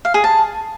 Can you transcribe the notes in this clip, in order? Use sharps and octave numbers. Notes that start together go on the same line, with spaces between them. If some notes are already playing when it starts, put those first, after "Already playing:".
F5
G#4
A5